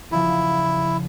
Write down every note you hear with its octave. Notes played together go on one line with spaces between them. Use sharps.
E2 C#3 F3 E4